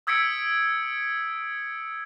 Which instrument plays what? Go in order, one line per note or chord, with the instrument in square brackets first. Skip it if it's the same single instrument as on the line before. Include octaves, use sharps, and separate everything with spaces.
[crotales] D#6 E6 G#6 B6 C#7 D7